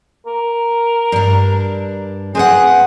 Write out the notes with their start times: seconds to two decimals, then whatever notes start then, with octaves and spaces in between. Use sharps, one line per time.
0.26 A#4
1.12 G2 D4
2.35 C4 G#4 B4 F#5